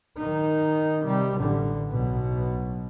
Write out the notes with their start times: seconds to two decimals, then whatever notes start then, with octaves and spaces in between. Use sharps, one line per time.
0.18 D#3 D#4
1.06 C3 G3
1.38 A1 D3
1.91 B1 B2